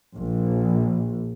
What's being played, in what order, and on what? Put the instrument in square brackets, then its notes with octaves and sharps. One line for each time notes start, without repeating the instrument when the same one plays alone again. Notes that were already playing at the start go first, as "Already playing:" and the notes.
[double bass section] A#1